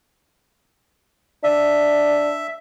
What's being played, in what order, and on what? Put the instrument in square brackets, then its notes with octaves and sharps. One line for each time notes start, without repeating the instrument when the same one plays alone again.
[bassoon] D4 [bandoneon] E5